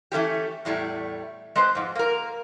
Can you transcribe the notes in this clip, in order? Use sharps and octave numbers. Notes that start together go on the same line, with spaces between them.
E3 A3 C#4 G4
E2 A2 G3 A3
G#3 C4 B4 C5
F2 G#2
A#3 A#4